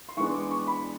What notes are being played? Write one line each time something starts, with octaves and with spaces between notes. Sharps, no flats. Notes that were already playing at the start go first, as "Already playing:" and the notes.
C6
E3 G#3 B3 D4 C#6
D6
C#6
B5